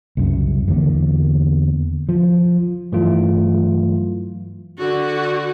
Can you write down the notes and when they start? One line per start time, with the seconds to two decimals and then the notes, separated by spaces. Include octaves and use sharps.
0.17 C2 F#2 C#3
0.68 E2 D3 A#3
2.09 F3
2.92 G2 E3 F#3 A3 F4
4.78 D3 F#4